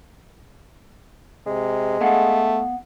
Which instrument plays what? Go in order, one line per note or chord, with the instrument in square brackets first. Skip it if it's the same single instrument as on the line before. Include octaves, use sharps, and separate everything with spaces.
[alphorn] C3 [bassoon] G#3
[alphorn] A3 [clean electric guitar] B3 F5 F#5